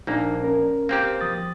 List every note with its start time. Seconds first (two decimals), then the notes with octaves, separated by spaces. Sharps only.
0.07 A#1 A#3 D4 D#4
0.42 C#4 A#4
0.89 A#3 C4 G4
1.21 F3 D#6 A6